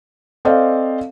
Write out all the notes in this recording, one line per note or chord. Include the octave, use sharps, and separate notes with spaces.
C4 A4 C5 D5 D#5 F5